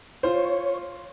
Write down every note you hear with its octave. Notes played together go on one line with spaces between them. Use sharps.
F4 C5 C#5